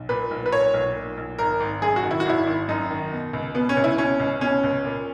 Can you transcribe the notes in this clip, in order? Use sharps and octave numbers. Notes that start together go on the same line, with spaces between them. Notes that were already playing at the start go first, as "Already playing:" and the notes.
Already playing: B1
A#2 B4
B1
B4
A#2 C#5
B1
A#2
B1
G#1 A#4
G#1
F#2 G#4
F#4
D#3
E4
F#4
G#1 E4
G#1
F#2 D#4
D#3
B2
C#2
B2 B3
C#4
C#2
E4
B2 C#4
C#2
B2 C#4
C#2
A#2